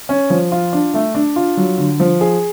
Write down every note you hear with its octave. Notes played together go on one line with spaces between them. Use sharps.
C#4
F3
F4
D4
A3
D4
F4
F#3
D3
F3
G#4